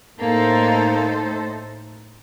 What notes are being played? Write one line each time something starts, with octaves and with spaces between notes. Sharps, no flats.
A2 A3 A#3 D#4 A4 C5